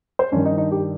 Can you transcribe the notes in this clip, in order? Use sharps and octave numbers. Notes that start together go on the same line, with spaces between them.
C5
G2 D#3 C#4
D#4
D#4
G4